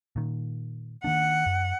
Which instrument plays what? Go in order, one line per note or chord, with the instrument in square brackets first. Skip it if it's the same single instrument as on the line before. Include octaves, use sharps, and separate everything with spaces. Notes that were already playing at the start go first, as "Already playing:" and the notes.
[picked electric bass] A#2 D#3
[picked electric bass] D#3 A#3 D4 [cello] F#5
[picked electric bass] F#2